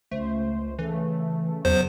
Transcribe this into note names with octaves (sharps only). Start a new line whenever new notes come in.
C#2 A3 C5
C#3 E3 A3
E2 C#3 F#3 C5